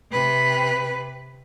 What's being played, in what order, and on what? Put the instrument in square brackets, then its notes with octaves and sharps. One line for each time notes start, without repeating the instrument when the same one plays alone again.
[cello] C3 B4